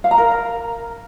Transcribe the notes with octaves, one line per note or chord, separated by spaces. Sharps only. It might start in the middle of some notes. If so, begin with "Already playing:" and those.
F5
A#5
A#4